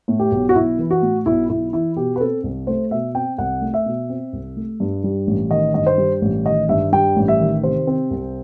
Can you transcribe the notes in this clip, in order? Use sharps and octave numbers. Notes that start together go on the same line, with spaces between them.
A2
G4
B1
F#4
B1 E4
E3
F#4
A2
B1 E4
B1 E4
E3 E4
B2 G4
B4
C4 A4
C2
A3 C5
B2 E5
C4 G5
C2 F#5
A3
E5
B2
C4
C2
A3
G2
G3
A1
D#3 D#5
G2 D#5
C5
G3
A1
D#3 D#5
G2 E5
G3 G5
A1
E5
D#3
C3 C5
C4
C2